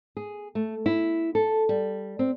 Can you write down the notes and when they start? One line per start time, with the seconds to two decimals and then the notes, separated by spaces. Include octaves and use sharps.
0.17 G#4
0.55 A3
0.86 E4
1.35 A4
1.69 G3
2.19 C4